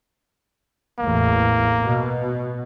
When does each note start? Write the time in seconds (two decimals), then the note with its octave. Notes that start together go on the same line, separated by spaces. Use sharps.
0.99 A1 E2 A2 A#3
1.82 B2